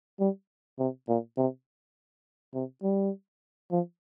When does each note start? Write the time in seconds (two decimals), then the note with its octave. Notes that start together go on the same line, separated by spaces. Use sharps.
0.20 G3
0.79 C3
1.08 A#2
1.37 C3
2.54 C3
2.83 G3
3.71 F3